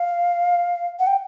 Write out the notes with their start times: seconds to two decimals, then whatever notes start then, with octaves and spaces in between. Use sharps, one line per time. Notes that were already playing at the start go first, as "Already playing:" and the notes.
Already playing: F5
0.99 F#5
1.07 G5